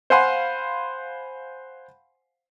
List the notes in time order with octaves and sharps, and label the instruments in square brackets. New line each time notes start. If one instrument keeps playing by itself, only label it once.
[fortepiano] C5 F5 F#5 G#5 B5 C6